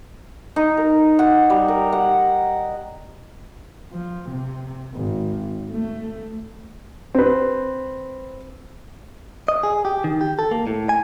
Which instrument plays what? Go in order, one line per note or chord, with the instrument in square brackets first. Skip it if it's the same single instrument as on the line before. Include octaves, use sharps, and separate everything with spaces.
[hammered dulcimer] D#4
A#4
F#5
G3
A#4
F#5
[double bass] F3
C3
G#1
A3
[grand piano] C4 B4
[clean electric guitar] D#5
G#4
G4
D#3
G4
A4
A#3
A2
G#5